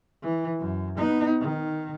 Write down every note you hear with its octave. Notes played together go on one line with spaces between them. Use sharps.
E3
F#2
B3 D#4
D#3